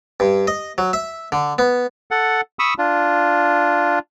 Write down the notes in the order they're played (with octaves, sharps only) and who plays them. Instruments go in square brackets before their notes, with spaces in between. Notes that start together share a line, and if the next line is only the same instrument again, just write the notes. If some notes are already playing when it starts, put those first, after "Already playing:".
[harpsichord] G2
D#5
F#3
E5
D3
B3
[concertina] A4 F#5
B5 C#6 D#6 E6
D4 F4